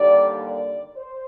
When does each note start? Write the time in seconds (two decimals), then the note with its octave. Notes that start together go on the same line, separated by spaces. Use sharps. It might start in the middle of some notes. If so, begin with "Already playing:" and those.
Already playing: D#2 D3 G3 A#3 D5
0.42 D5
0.96 C5